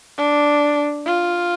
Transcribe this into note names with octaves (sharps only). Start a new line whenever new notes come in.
D4
F4